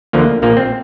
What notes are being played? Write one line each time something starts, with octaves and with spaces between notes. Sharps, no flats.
D2 D3 F3 A#3
A#1 A#2 F3 A#3
C4